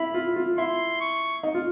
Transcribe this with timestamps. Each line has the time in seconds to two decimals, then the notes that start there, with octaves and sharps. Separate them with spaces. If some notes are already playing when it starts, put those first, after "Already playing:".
Already playing: E4 B5
0.14 F4
0.36 F4
0.58 E4 C6
1.01 C#6
1.43 D#4
1.55 F4